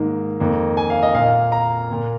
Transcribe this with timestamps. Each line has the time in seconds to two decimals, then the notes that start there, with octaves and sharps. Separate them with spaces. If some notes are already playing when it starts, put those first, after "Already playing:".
Already playing: G#2 D#3 A#3
0.40 F2 D#3 A#3
0.77 G#5
0.90 F5
1.03 D#5
1.15 A#2 A#3 F5
1.52 A#5
1.90 A#2 A#3